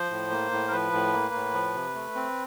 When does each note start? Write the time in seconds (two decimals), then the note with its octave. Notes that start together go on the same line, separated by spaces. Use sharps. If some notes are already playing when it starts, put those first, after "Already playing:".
Already playing: F3 C5
0.11 A2
0.31 A#3
0.51 A2
0.68 A#4
0.72 F3 B4
0.93 A2
1.13 A#3
1.34 A2
1.54 F3
1.74 C3
1.95 A3
2.15 C4